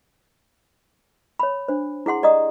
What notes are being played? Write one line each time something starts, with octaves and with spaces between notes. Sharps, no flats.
C#5 B5
D4 C5
E4 G#4 F#5 C6
G4 D5 D#5 A#5 D#6